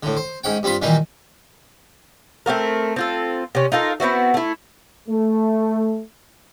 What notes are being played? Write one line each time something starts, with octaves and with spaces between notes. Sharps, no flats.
A2 D3
C5
G#2 C#4 F#5 G5
G2 G3 C4 F4 B5
A#2 D#3 E3 G3 A#3 D#4
A3 C4 F#4 A#4
C4 F4 A4
C3 C#4
D#4 F4 A4 A#4
B3 C4 E4 F#4
A3 E4
A3